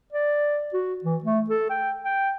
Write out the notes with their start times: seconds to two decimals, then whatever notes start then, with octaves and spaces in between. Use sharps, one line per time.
0.13 D5
0.74 F#4
1.04 E3
1.24 A3
1.50 A4
1.70 G5
2.04 G5